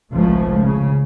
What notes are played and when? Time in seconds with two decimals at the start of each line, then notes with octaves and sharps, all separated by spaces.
0.13 G#1 C#2 C#3 F3 A3
0.60 C#3